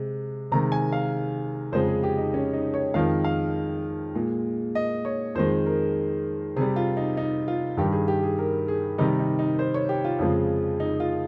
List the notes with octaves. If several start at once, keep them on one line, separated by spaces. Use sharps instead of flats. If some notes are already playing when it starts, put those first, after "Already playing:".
Already playing: C3 G#3
C3 D#3 G#3 A#5
G#5
F5
F2 C#3 G#3 C5
G#4
G4
D#4
C#4
D#4
C#5
F2 D#3 G#3 F5
F5
A#2 G#3
D#5
C#5
F2 D#3 G#3 C5
A#4
C3 G3 G#4
F4
D#4
D#4
F4
G2 D#3 G3 G4
G#4
G4
G#4
A#4
G#4
C3 D#3 G3 D#4
D#4
D#4
C5
C#5
G4
F4
F2 C#3 F3 G#3
D#4
F4